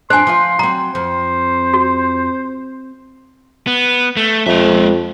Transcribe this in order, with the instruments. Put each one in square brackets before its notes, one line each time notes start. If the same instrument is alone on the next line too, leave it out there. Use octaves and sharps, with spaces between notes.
[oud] F2 D4 [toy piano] C5 G#5 [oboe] C6
[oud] F3 F4
[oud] F#3 C4 [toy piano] A#5
[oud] F2 [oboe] C5
[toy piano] F#4
[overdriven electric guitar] B3
A3
[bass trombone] F2 [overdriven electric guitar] G#3 E5